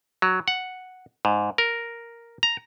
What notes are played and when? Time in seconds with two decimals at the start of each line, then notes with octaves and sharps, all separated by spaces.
0.22 F#3
0.48 F#5
1.25 G#2
1.58 A#4
2.43 A#5